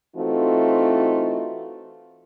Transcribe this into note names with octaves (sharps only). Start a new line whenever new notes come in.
E3 A3 C4 D#4 F4 F#4